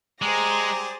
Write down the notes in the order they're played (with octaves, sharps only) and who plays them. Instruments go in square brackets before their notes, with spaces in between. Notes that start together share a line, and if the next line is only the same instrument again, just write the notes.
[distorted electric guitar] G#3 [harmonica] G4 D5 [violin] G#4 C5 [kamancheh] A#5